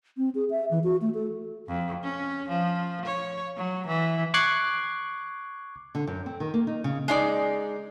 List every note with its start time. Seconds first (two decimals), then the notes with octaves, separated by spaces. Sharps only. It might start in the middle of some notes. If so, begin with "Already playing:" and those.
0.17 C4
0.35 G#4
0.50 E5
0.71 E3
0.84 F#4
1.02 A3
1.14 A4
1.68 F2
2.03 C#4
2.49 F3
3.06 C#5
3.57 F#3
3.87 E3
4.34 C#6 D6 F#6 G#6 C7
5.95 D3
6.07 F#2
6.26 C4
6.40 D#3
6.54 A#3
6.67 D#4
6.84 C#3
7.08 G#3 D#4 D5